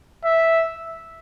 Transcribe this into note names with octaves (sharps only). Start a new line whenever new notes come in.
E5